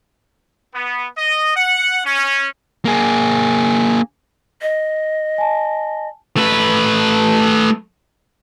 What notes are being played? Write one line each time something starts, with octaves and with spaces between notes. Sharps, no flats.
B3
D#5
F#5
C#4
A#3 G#4
D#5
G#5 A5
A3 B4